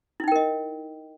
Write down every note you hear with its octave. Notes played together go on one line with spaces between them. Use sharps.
D#4 E4 A#4 D#5 G5